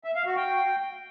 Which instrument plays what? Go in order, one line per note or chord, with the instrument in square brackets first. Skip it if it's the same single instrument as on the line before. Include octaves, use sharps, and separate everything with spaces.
[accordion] E5
F5
F#4
G5